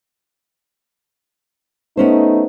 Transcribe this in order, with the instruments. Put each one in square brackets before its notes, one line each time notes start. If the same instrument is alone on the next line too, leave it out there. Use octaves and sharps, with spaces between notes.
[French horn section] A3 D#4 [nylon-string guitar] B3 C#4 C5